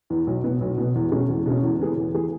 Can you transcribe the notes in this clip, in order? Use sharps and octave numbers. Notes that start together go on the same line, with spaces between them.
E2 E3
B1
B2 B3
B1
B2 B3
E2
B2 G#3 C#4
E2
B2 G#3 C#4
E2
E3 B3 G#4
E2
E3 B3 G#4